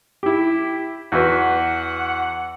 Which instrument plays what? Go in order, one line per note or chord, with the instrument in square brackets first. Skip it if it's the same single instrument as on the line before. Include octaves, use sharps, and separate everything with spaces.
[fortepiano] E4 G4
[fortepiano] E2 F#4 B4 [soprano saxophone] F#5